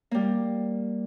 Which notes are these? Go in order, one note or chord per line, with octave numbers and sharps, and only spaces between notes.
G3 A#3